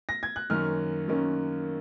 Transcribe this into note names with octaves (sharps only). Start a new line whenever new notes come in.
A#6
G#6
F#6
F#2 D#3 A#3 C#4 F6
F#2 D#3 A#3 C#4